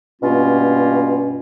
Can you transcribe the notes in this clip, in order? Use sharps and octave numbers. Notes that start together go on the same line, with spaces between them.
G2 B2 A#3 C#4 F4